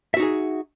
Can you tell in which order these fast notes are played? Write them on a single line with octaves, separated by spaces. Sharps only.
E5 F#4 D#4 G#4